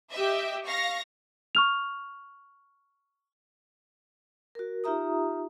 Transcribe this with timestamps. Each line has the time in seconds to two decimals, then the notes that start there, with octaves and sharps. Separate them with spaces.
0.11 G4 D#5 E5
0.66 F5 C#6 A#6
1.55 C#6 F6 F7
4.55 F#4 A#4
4.84 D#4 F4 G4 E5 A#5 D#6